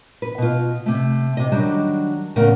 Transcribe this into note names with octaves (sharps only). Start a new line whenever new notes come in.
B4
B2 F4
C3 A3
C3 D#5
D#3 F#3 G3 D4
E2 A2 C#3 A#4 F#5